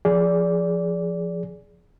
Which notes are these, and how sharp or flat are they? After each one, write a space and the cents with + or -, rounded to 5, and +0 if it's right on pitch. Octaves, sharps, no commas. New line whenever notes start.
F3 +0 G#4 +5 D5 -20